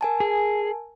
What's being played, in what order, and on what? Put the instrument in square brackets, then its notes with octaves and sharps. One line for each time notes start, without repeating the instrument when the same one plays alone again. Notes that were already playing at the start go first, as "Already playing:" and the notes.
[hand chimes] A#4 G#5 A5
[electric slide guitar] G#4